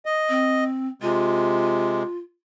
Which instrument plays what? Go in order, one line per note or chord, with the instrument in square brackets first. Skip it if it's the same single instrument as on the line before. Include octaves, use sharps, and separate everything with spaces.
[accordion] D#5
[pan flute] C4
[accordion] C3 G#3 [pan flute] F4